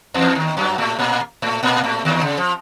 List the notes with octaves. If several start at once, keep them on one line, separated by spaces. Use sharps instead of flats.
E2 E3
D#2 D#3
F#2 F#3
A2 A3
A#2 A#3
A2 A3
A#2 A#3
A2 A3
D#2 D#3
C#3
F3